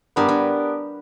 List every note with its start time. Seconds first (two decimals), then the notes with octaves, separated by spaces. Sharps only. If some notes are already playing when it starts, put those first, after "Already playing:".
0.16 G2 B3 D4 G4 A#4
0.29 G2